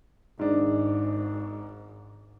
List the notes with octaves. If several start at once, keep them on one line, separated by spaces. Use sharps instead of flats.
G#1 G#2 D4